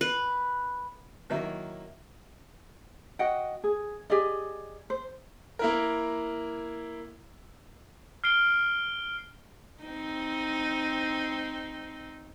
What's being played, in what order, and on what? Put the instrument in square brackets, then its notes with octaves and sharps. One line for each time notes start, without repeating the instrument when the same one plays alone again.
[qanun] B4
[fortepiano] D#3 F#3 A#3 E4
[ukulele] F#4 D#5 F#5 G5
G#4
G4 G#4 D5 D#5
C5
[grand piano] A#3 E4 A#4
[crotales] F6 C7 D7 G7
[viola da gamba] C4 D#4